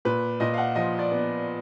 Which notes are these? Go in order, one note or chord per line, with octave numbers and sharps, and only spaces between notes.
A#2 B4
A#2 D#5
F5
F#5
F3 D#5
D5
B3